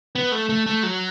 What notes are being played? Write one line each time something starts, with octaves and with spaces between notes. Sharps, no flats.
B3
A3
A3
A3
F#3